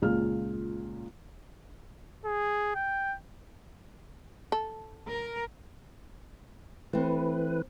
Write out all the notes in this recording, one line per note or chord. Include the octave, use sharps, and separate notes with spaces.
C#2 A#2 F4 F6
G#4
G5
A4
A#4
E3 A3 C4 B4